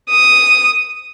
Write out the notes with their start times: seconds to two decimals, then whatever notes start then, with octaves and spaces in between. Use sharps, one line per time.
0.10 D#6